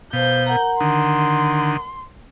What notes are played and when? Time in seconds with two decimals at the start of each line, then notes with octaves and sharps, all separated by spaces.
0.13 B2 C5 F5 G6
0.46 A#4 F#5 A#5
0.80 D3 D#3 C6